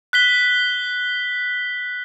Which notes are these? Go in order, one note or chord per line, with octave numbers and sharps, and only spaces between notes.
F#6 B6 G7